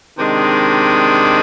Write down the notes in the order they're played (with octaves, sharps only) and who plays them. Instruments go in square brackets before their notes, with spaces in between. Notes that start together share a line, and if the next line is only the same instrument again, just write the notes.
[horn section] C3 D#3 G#3 D4